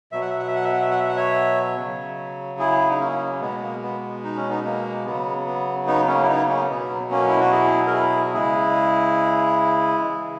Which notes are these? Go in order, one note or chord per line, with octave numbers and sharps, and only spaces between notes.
B2 F#3 E5
F#5
E5
F#5
E5
F#5
E5
F#5
E5
F#5
E5
F#5
C#5 E5
C#3 F#3
E4 G#4
D#4
A#3 C#4
B2 G#3 B3
A#3
B3
D#4
C#4
B3 D#4
A#3
C#3 F#3 B3
B3
B3 D#4
A#3 C#4
E4
B3 D#4
A#3 C#4
B2 F#3 B3
A#3 C#4
E4
F#4
E4 G#4
A#4
E4 G#4
C#3 G#3 E4 G#4
C#3 E3 G#3